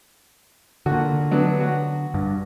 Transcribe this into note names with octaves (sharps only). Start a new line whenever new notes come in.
A#2 D3 F#4
F#3 B3 D4
F#4
G2